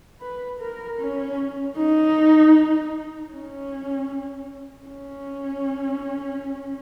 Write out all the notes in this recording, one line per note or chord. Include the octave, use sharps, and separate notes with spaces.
B4
A#4
C#4
D#4
C#4
C#4